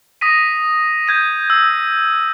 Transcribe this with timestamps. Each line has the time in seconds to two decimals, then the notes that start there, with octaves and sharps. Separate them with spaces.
0.21 D#6 A#6 B6 D#7
1.08 G6 G#6 D#7
1.50 E6